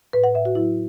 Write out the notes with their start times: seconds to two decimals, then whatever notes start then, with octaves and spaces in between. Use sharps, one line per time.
0.13 A2 B4
0.24 F#5
0.34 A2 E5
0.45 F#4
0.55 F#3 E4